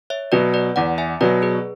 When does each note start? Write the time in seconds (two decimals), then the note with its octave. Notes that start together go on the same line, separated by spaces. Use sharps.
0.10 C#5 E5
0.32 B2 F#3 B4 D5
0.54 B4 D5
0.76 E2 D5 F#5
0.98 E5 G#5
1.21 B2 F#3 B4 D5
1.42 G#4 B4